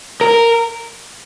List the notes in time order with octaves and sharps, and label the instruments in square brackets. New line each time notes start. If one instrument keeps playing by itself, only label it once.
[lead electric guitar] A#4